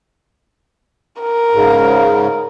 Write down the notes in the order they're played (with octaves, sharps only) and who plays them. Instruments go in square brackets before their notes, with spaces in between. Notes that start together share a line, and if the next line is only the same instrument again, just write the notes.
[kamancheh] A#4
[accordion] G#2 C#3